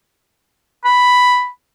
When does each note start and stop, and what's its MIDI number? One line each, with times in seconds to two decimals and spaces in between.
0.85 1.48 83